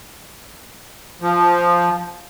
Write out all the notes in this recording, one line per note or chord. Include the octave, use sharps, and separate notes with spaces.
F3